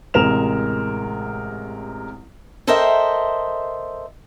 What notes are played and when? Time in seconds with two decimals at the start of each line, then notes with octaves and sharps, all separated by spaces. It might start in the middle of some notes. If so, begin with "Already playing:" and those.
0.14 A1 C3 G#3 A#4 E7 F7
2.67 A4 A#4 C5 D#5 E5 G5